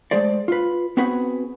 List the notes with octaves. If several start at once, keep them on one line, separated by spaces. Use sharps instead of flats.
G#3 A3 G#4 C5 D5
F4 B4
B3 C4 F#4 G#4 B4 F#5